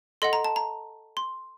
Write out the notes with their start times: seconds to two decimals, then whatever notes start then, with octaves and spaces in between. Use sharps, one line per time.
0.22 A4 D#5 F#5 C6
0.33 A#5
0.45 A5
0.56 A#5
1.17 C6